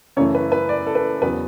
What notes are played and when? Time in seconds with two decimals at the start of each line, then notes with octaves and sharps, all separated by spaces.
0.17 F#2 C#3 E3 A3 C#5
0.35 B4
0.52 B4
0.69 D5
0.87 A4
0.95 B4
1.22 E2 C#3 F#3 B3 B4